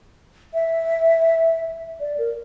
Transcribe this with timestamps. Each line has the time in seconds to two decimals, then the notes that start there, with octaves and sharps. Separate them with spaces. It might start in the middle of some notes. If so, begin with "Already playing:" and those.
0.54 E5
2.00 D5
2.18 A#4